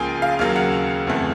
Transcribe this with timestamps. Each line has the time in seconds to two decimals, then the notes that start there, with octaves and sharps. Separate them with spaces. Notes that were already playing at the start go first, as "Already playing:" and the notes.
Already playing: C#2 C#3 F3 A#3 G5 G#5
0.22 F5
0.39 D#2 C#3 F#3 A#3 F5
0.56 F#5
1.07 F#1 E2 C3 E3 A3